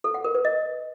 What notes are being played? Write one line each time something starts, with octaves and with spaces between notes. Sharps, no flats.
A4
F#5
A#4
B4
D#5